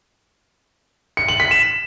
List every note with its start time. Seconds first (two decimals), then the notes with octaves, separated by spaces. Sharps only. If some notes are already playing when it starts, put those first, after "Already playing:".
1.17 C#7
1.28 F#7
1.40 B6
1.51 E7